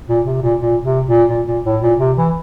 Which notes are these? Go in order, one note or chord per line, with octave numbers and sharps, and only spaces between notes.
A#2
C3
A#2
A#2
C3
A#2
A#2
A#2
A2
A#2
C3
E3